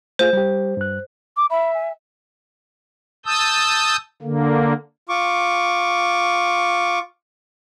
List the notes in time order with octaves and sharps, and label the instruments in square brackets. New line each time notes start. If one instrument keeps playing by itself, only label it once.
[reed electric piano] A3 F4 G#4 [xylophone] C5
[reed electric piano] G3 G4
G2 F#6
[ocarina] D6
[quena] E5 [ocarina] B5
[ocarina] G#5
[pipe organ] A5 D#6 E6 G6
D3 A#3
[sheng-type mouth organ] F4 C#6 D6